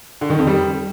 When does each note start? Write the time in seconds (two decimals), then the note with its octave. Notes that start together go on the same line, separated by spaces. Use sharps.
0.21 D3
0.30 D#3
0.38 F2
0.47 G3